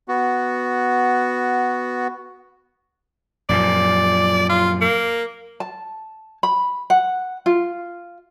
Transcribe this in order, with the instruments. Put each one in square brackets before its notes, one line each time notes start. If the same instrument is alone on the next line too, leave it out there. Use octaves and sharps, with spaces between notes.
[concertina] B3 F#4
[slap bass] F#2 A#2 F3 [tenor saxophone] D5
[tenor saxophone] F4
A#3
[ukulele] A5
B5
F#5
F4